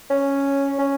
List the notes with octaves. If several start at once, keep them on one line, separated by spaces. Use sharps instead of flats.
C#4
C#4